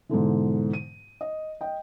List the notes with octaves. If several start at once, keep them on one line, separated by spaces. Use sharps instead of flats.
G#2 B2 D3 E3
D#7
D#5
D#5 G5